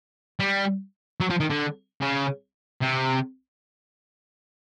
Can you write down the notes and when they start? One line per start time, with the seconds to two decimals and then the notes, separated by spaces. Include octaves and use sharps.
0.40 G3
1.20 F#3
1.30 F3
1.40 D#3
1.50 D3
2.01 C#3
2.82 C3